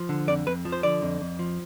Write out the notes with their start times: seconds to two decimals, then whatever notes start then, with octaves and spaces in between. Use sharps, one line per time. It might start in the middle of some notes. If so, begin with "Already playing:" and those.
Already playing: F3
0.09 D3
0.27 F2 D5
0.46 F2 B4
0.65 F3
0.72 C5
0.83 D3 D5
1.02 F2
1.21 F2
1.39 F3